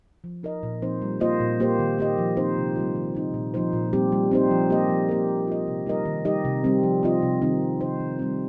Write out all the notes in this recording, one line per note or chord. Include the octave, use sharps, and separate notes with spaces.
F3
D#4 A#4 D#5
A#2
F3 C4 D#4 C5
G3
A#3 F4 C5 D#5
A#2
A#3 G4 C5
D#3
A#3 G4 D#5
F3
C4 D#4 C5
C3
G3 C4 F4
D#3
C4 D#4
A#2
F3 A#3 D#4 C5
A#2
G3 C4 G4
G3
C4 D#4 C5
F3
A#3 G4 D#5
F3
A#3 G4 A#4
A#3
F4 D#5
C3
G3 D#4 A#4 D#5
D#3
G3 D#4 G4 D#5
C3
G3 C4
F3
C4 F4 D#5
C3
D#3 G3 C4 D#4
G3
D#4 C5
D#3
G3 C4